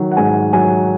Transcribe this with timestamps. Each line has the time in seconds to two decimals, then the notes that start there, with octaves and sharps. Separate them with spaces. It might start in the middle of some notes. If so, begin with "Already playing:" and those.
Already playing: D#3 F#3
0.12 F#5
0.17 G#2 G#5
0.53 F#3 G#5